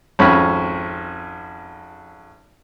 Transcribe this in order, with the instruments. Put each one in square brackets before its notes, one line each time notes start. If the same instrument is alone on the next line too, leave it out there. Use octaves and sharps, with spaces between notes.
[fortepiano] G#1 F2 C#4 B5